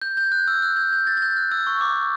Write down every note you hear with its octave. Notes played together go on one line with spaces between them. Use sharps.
G6
G6
F#6
E6
F#6
G6
G6
A6
A6
G6
F#6
E6
C#6
D6